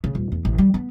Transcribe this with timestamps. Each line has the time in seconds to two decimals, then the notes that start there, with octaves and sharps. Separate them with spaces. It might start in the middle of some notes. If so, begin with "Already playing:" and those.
0.04 C#3
0.15 D#1
0.32 E2
0.45 A1
0.58 G3
0.74 B3